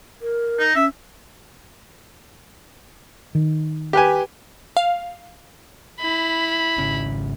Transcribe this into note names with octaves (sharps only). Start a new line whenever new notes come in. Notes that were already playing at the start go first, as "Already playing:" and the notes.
A#4
D#4
C#4 E5
D#3
G4 B4 G#5
F5
E4 B5
G#1 C#3 C#4